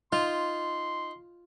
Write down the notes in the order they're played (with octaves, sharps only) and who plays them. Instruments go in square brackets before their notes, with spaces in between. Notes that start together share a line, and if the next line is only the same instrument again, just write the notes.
[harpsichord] D#4 [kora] F4 [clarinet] C6